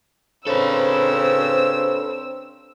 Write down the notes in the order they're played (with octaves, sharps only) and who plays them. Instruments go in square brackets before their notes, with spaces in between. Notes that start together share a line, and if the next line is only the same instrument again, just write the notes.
[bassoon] C#3 [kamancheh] C4 E6 [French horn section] D4 C5 [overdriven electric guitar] A4 B4